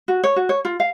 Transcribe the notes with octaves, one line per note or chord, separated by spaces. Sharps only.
F#4
C#5
F#4
C#5
F4
F5